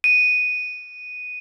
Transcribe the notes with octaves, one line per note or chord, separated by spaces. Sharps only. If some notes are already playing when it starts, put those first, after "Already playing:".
D#7